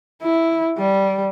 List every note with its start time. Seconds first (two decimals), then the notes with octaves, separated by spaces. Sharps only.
0.22 E4
0.78 G3